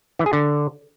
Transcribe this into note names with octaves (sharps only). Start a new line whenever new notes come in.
E3
G#4
D3